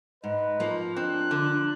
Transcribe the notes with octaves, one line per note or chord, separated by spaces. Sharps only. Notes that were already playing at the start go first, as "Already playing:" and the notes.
G#2 B4 D#5
F3 A#3
C4 D4 F#6
D3